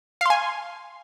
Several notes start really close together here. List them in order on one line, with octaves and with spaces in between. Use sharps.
F5 C6 G#5